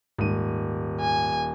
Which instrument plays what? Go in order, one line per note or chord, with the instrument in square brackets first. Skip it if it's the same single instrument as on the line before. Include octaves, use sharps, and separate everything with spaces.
[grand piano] D#1 D#7 [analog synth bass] G#2
[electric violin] G#5